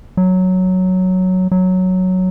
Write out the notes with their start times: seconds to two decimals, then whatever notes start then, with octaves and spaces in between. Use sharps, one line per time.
0.17 F#3
1.52 F#3